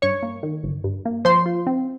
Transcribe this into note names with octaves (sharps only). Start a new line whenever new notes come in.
G2 C#5 C#6
A#3
D#3
G1
G2
A#3
F3 C5 C6
F4
C4